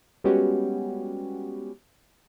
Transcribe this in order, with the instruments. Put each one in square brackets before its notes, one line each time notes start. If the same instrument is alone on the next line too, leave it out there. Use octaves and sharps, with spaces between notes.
[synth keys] G3 G#3 B3 C#4 F#4 G4